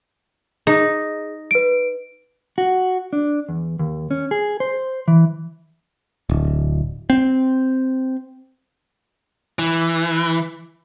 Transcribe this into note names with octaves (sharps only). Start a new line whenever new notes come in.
D#4 G#4
B4 D7
F#4
D4
E2
D#2
C#4
G#4
C5
E3
D1
C4
E3